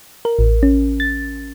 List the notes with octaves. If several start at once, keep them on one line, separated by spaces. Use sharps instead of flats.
A#4
A1
C#4
A6